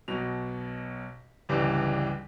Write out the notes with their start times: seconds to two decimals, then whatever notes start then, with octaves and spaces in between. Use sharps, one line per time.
0.08 B1 B2 F7
1.49 G1 C#2 E3 G3